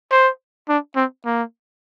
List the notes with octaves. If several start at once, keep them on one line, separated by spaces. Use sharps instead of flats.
C5
D4
C4
A#3